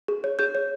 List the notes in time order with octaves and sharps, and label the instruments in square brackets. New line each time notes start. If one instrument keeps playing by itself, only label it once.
[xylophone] G#4
C#5
G#4 G6
C#5